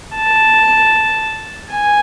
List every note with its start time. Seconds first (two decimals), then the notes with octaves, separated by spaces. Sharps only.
0.15 A5
1.71 G#5